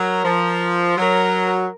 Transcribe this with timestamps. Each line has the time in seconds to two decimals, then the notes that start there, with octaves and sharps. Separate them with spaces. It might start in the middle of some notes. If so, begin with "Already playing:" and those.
Already playing: F#3 A#4
0.25 F3
0.97 F#3 A#4